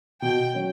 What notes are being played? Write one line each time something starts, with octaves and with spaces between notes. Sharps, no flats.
B2 G5
F#3 C#4